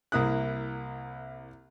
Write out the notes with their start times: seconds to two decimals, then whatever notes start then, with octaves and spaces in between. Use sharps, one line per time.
0.12 C2 A#3 E4 D#6 F#6